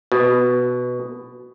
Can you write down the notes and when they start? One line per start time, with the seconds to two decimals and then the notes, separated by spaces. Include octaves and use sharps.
0.12 B2